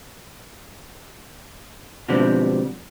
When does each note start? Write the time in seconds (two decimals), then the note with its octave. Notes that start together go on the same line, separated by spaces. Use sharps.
2.08 B2 D3 F3 G3 G#3 C4